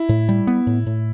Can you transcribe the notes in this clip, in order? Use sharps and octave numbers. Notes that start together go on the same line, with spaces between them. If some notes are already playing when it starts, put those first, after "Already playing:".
Already playing: E4
A2
G3
B3
A2
A2